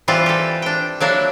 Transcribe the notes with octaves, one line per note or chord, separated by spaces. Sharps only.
E3 G3 C4 F4
G4 A4
D4 G5
F#3 A#3 D4 E4